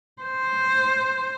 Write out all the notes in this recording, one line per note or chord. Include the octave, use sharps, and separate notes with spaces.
C5